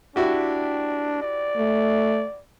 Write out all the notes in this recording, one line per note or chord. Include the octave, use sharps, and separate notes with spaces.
D4 E4 F#4 G4
D5
A3